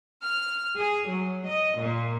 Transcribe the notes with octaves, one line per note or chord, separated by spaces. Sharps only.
F6
G#4
F#3
D#5
A#2